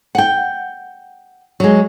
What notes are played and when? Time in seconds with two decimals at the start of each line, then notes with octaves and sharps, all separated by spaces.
0.15 F#5 G5
1.60 F#3 G#3